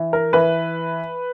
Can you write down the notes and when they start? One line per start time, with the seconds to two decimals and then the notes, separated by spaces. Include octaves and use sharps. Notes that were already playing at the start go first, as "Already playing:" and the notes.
Already playing: E3
0.13 A#4
0.33 E3 B4